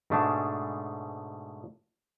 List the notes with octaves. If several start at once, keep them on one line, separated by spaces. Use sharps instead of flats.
G#2 B2 A3 D4 G#4 A5